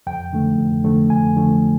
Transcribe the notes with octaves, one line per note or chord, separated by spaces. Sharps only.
F2 G5
D3 F3 A3
F2
D3 F3 A3
F2 G#5
D3 F3 A3